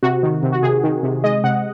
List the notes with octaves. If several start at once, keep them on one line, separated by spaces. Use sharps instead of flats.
C3 F#4
D#3
C3
F#4
C3 G#4
D#3
C3
G#3 D#5
C3 F#5